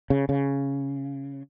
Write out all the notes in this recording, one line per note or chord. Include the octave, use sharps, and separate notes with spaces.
C#3
C#3